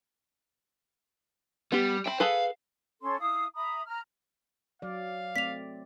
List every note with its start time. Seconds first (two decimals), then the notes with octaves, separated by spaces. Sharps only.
1.72 G3 B3 G4
2.06 C5 E5 G5 B5
2.20 G#4 A4 B4 F5
3.01 C#4 A4 C#5 C6
3.20 E4 F5 D#6
3.55 E5 A#5 B5 D#6
3.87 A#5 F6
4.82 F#3 D5 F5
5.36 A3 C4 D5 B6 F7